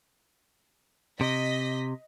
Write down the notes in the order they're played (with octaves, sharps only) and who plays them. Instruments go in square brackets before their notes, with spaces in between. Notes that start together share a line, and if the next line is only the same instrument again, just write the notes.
[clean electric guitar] C3 [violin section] D#5 B6